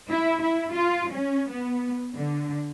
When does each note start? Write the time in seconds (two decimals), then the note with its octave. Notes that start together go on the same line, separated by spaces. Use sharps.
0.10 E4
0.42 E4
0.73 F4
1.11 C#4
1.49 B3
2.14 D3